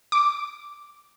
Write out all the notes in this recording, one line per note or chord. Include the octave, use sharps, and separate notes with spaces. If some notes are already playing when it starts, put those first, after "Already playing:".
D6